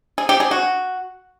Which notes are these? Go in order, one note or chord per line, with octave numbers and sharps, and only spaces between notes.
G#4
G4
G#4
F#4